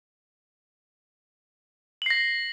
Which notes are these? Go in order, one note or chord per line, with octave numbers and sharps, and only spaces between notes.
A#6 C7 F#7